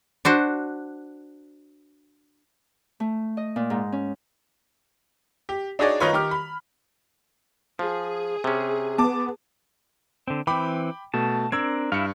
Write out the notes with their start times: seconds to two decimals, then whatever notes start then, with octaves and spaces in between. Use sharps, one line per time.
0.25 D4 F#4 C5
3.00 A3
3.37 D#5
3.56 A#2
3.70 G#2
3.92 C#4
5.49 G4
5.79 D4 D#4 F#4 G#4 C#5 D5
6.00 D#3 D#4 F4 B4 C#5
6.13 D#3 G4 D6 F6
6.31 B5
7.79 F3 G#4
8.44 C3 C#4
8.98 B3 A5 D6
10.28 D3 C4
10.47 E3 C4 G5 B5 D6
11.14 B2 A3 A5
11.52 C4 D4 A#4 E6 G#6
11.92 G2 E4 F5 C#7